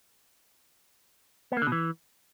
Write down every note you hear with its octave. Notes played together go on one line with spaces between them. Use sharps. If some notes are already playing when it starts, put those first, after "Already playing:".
B3
A#3
D3
B2
E3